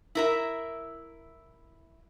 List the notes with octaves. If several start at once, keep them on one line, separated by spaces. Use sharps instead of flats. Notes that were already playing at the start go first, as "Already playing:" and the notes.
E4 A#4 E5